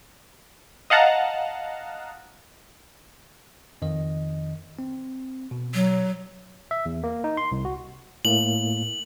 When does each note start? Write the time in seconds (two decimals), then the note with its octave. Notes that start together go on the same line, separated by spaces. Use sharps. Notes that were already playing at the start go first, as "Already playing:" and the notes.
0.90 D#5 F5 F#5 A5 A#5
3.82 F2 D#3 D#5
4.79 C4
5.51 B2
5.74 F#3
6.71 E5
6.86 E2
7.04 A#3
7.24 D#4
7.37 C6
7.52 C2
7.65 F#4
8.25 A2 A#3 F#7